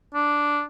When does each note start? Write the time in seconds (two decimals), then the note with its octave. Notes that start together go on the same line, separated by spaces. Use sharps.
0.14 D4